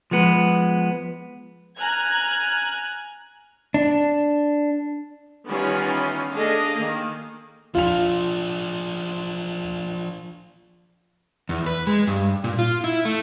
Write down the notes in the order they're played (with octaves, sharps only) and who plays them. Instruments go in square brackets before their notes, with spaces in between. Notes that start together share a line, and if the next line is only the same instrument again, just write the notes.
[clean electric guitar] F3 G#3 B3 B4
[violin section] G#5 A#5 F6 F#6 G#6
[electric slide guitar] D4
[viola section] D#3 E3 G3 B3 C#4 F4
A3 D4 G#4 A4 D#5 F5
D#3 A#3
[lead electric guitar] F3 D4 [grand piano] F4 F7
[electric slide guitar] E2
B4
G#3
G2
A#2
F4
E4
A3